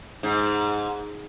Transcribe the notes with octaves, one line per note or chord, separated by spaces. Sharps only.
G#2